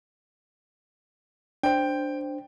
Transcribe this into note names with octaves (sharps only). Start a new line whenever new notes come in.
D4 C5 G5